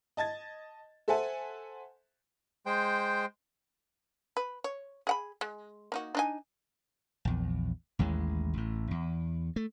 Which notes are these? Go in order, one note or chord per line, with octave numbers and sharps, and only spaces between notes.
D#5 A5 G#6 A6
A4 C5 E5 F#5 G#5 A5
G#3 C5 G5
B4
C#5
G#4 F#5 B5
G#3
A#3 D#4 F#4
D4 D#4 G#5
A#1 E2
A1 D#2 E3 G#3
A1 A2
E2
A3